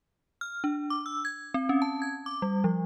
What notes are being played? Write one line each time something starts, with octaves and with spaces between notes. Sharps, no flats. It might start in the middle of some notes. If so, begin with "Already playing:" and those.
F6
D4
D6
E6
G#6
C4
C#4
A5
G#6
D6
G3
F3